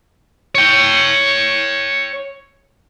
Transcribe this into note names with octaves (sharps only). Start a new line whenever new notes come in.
C#5 G5